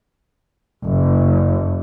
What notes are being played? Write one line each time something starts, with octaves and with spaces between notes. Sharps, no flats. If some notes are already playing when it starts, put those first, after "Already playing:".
F#1